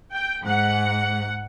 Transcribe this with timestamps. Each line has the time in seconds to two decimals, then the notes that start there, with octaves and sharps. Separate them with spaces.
0.14 G5
0.45 G#2 F#5